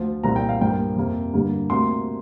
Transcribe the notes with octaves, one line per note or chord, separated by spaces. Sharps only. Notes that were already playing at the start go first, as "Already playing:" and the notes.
Already playing: D2 F3
C2 A#2 F3 A#3 A#5
G5
F5
G2 F3 A#3 G5
F2 C3 A#3
G2 D3 G3 A#3
D2 C3 G3 A#3 C6